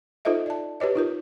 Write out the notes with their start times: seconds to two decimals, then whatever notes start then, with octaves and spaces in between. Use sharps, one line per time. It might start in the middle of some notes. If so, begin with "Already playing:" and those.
0.25 D#4 F4 A4 C5 D#5 E5
0.46 D5 A5
0.80 G4 B4 C#5 D#5
0.95 D#4 F4 A#4